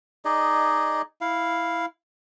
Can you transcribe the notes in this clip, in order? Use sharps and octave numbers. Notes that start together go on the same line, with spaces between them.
D#4 G#4 D5 D#5
E4 F5